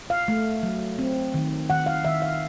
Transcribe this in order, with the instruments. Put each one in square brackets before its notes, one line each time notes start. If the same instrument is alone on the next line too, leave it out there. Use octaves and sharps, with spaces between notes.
[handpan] F5
A3
F#3
C4
D#3
D#3 F#5
F5
D#3 E5
F5